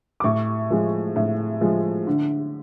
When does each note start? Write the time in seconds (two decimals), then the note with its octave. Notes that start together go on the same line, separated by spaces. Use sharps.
0.20 D6
0.24 A2 C#6
0.70 F3 G#3
1.16 A2
1.61 F3 G#3
2.07 D3